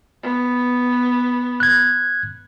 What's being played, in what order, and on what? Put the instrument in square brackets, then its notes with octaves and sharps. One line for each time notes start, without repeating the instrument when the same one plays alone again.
[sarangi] B3
[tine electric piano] F#6 G#6